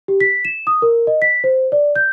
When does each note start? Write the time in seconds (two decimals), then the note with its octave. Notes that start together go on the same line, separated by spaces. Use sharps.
0.08 G4
0.20 B6
0.45 E7
0.67 D#6
0.82 A#4
1.07 D#5
1.22 B6
1.44 C5
1.72 D5
1.96 G6